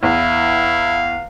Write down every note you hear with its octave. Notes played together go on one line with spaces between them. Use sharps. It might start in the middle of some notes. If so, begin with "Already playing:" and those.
E2 E4 F5